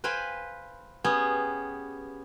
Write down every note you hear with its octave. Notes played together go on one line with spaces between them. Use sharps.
B4 C5 F5 G5 G#5 B5
B3 C#4 G4 G#4